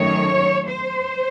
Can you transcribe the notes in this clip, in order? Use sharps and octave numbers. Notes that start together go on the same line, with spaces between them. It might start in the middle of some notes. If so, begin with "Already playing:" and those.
Already playing: F#2 D#3 A3 C#5
C5